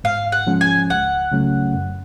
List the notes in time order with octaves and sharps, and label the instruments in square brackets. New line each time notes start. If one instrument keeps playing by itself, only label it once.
[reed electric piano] G#2 [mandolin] F5
[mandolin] F#5
[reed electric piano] F3 G#3 C#4
[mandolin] G#5
[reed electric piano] C#2 [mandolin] F#5
[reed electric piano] C#3 F#3 A3 C#4
F#2